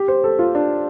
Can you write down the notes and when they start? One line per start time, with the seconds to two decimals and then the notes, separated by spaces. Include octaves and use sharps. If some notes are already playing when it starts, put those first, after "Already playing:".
Already playing: G4
0.08 C5
0.24 A4
0.39 F4
0.55 D4